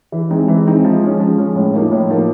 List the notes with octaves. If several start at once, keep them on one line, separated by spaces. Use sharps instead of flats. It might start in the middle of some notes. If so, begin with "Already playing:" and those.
E3
G#3 C4 D#4
E3
G#3 C4 D#4
F3
G#3 C#4
F3
G#3 C#4
A2
F3 A#3 D#4
A2
F3 A#3 D#4